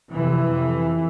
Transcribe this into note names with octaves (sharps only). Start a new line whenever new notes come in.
F2 C3 E3
F2 C3